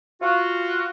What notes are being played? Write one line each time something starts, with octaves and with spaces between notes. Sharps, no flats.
F4 F#4